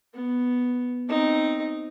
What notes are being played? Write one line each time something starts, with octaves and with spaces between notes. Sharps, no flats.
B3
C4 D#4